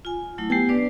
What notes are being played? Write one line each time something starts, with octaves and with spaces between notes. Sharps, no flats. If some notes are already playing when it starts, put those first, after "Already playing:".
F4 G#5
F#3 A3 E4
B3 G4 G5 G#5 C7
D4 B4 D5